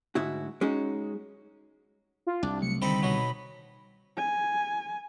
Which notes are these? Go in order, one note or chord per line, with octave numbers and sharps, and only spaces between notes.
D2 G#2 E4 F#4
G#3 C#4 D#4 F#4
F4
C2 D4
C3 F#3 A3 C#7
D3 D#3 G3 C4 D#4 A4 B5
B2 F#3 D#4
G#5